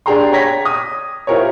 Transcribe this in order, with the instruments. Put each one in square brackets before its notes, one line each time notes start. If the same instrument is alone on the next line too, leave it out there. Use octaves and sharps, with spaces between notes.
[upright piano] D4 G4 G#4 G5 A#5 C6
C#5 G5 A#5 G#6 A#6 B6
D#6
E4 F4 G4 A#4 C5 C#5